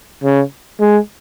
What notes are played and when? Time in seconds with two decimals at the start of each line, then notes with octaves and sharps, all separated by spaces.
0.24 C#3
0.80 G#3